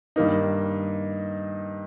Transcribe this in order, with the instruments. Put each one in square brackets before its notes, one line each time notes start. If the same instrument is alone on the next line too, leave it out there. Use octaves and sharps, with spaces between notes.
[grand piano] G2 D#3 A#3 D#4